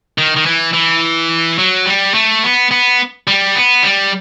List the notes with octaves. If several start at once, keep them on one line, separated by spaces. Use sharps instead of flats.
D#3
D#3
E3
E3
F#3
G3
A3
B3
B3
G3
B3
G3